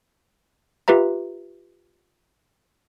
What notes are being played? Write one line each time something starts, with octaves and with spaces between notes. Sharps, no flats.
F4 G4 B4 E5 A#5